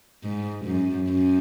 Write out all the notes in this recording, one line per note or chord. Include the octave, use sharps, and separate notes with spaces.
G#2
F#2
F#2